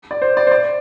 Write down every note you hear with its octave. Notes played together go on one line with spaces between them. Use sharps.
D5
C5
D5
C5
D5